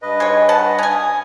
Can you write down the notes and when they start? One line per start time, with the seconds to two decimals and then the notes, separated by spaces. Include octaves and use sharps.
0.02 G2 B4 D#5
0.20 G#3 C#5
0.49 F#5 A5
0.78 C#4 G#5 D#6